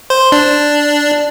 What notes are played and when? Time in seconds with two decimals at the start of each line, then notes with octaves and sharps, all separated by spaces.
0.10 C5
0.32 D4